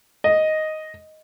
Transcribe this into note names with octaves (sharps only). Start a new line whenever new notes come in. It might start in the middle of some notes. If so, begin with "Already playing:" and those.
D#5